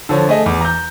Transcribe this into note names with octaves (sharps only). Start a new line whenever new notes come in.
D3 F3 C#5
A3 G#4 D#5
E2 D6
A#5 G6